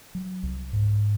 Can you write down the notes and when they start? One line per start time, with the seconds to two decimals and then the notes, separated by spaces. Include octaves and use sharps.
0.15 F#3
0.43 C2
0.73 G#2